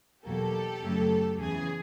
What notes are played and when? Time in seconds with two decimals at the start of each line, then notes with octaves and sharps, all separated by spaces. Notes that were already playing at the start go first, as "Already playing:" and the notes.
0.25 E2 B2 F#3 A#3 G4 A4
0.81 F#2 C#3 F#3 A3
1.38 E2 C#3 E3 G#4